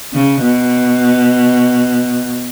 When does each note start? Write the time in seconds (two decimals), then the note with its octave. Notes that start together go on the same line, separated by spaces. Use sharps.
0.13 C#3
0.42 B2